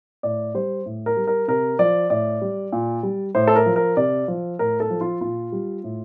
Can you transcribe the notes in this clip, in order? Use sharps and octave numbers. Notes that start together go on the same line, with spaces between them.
A2 D5
G3 C5
A2
A#4
G3
A#4
C3 A#4
F3 D5
A2 D5
G3
A#2
G3
A2 C5
A4
A#4
F3
A#4
C3 D5
F3
A2 A#4
A4
F3
F4
A#2 F4
G3
A2